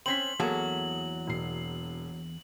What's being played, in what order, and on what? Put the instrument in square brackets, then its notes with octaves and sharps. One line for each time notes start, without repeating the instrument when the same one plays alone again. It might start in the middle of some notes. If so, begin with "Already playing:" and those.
[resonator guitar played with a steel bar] C4 C#4 [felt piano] C6 B6 [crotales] F#7
[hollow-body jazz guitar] E2 A#3 A5 [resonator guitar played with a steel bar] F#3 [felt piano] G#4 A4
[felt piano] E1 C7